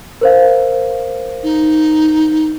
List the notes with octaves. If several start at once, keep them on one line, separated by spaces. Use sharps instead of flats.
A#4 C5 F5
D#4